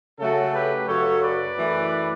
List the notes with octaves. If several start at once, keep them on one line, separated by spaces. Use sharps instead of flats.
C#3 F#3 A3 F#4 A4
G4 B4
F#2 C#3 F#3 A4 C#5
B4 D5
F#2 E3 A3